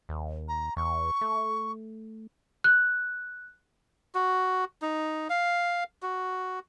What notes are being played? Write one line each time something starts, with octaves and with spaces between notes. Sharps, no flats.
D#2
A#5
E2 C#6
A3
F#6
F#4
D#4
F5
F#4